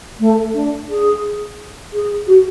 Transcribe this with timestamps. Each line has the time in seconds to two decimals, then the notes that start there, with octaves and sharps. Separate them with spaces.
0.19 A3
0.53 D4
0.88 G#4
1.92 G#4
2.26 F#4